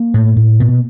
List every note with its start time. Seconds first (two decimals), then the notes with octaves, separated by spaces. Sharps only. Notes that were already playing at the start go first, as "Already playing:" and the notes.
Already playing: A#3
0.14 A2
0.36 A2
0.60 B2